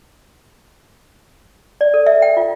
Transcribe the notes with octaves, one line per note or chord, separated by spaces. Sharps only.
D5
A4
E5
G5
F4